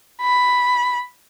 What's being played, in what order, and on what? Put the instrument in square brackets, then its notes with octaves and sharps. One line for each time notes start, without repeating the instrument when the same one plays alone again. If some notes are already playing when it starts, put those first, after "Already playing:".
[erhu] B5